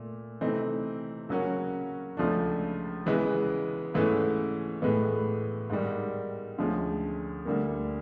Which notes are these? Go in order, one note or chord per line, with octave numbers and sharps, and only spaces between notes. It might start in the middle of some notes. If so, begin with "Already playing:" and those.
Already playing: A#2 A3
C3 E3 A3 C4 D#4
C#3 F#3 A#3 C#4 F#4
C#2 C#3 F3 A3 D4
C#3 E3 G#3 B3
G#2 E3 A3 C#4
A2 E3 G#3 B3
G#2 D#3 G3
D2 D3 F3 G#3 C#4
D2 D3 G3 A#3